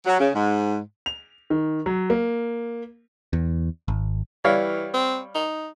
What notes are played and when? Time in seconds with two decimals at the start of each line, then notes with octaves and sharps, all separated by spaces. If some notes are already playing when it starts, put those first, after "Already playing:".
0.06 F#3
0.20 C#3
0.34 G#2
1.06 F7
1.50 D#3
1.86 F#3
2.10 A#3
3.33 E2
3.88 G#1
4.44 E3 G3 C#5 F5
4.94 C4
5.35 D#4